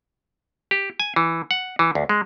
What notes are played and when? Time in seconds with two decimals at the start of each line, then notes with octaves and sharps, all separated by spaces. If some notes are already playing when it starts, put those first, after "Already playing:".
0.71 G4
1.00 G#5
1.16 E3
1.51 F#5
1.79 E3
1.95 D2
2.09 G#3